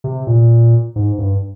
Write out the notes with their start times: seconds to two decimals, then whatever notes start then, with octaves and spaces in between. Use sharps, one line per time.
0.04 C3
0.27 A#2
0.96 G#2
1.18 G2